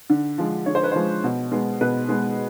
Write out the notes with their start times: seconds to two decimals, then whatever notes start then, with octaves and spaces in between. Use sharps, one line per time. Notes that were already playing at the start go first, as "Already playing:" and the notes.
0.10 D3
0.38 F3 G#3
0.66 D3 C#5
0.75 C5
0.83 B4
0.92 F3 G#3 C5
1.24 B2
1.52 G#3 B3
1.81 B2 B4
2.09 G#3 B3